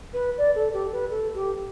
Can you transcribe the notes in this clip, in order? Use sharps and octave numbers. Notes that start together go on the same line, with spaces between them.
B4
D5
A4
G4
B4
A4
G4